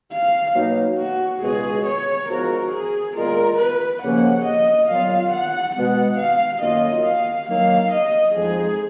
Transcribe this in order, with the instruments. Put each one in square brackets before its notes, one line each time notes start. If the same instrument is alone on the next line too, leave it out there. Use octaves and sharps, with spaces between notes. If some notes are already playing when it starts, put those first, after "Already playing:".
[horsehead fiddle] F5
[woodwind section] B2 F#3 A#3 D#4
[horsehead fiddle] F#4
[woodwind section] C#2 B2 G#3 B3 F#4 [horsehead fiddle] G#4
[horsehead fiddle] C#5
[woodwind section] G#2 F3 B3 F#4 [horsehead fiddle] A#4
[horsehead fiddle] G#4
[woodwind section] A#2 G#3 B3 F4 [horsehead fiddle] A#4
[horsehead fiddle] B4
[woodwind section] D#2 C#3 F3 A#3 C#4 [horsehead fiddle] F#5
[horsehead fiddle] D#5
[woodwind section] A#2 F#3 B3 F4 [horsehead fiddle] F5
[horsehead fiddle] F#5
[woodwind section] B2 G#3 B3 [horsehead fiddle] F#5
[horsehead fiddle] F5
[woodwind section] F#2 D#3 A#3 F4 [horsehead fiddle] D#5
[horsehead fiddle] F5
[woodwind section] D#3 F#3 A#3 [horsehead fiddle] F5
[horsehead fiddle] D#5
[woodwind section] F2 F3 G#3 D#4 [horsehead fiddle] G#4